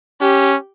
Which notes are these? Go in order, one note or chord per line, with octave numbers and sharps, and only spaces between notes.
C#4 G4